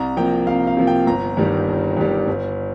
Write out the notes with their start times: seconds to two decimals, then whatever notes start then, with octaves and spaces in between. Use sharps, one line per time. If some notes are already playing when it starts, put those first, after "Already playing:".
Already playing: C2 A#5
0.17 C3 F3 A#3 G5
0.47 C2 F5
0.67 F5
0.77 C3 F3 A#3
0.87 G5
1.07 G1 A#5
1.37 G2 D#3 G3
1.68 G1
1.97 G2 D#3 G3
2.28 G1